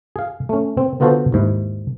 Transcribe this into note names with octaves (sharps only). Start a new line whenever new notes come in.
G#4 F5
A3 C#4
C4
D3 B3 F4 F#4 A4 C5
D#2 G#2 E4